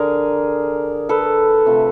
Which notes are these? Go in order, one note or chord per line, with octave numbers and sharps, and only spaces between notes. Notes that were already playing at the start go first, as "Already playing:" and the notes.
Already playing: D3 G#4 A#4
A4 B4
C3 F3 A3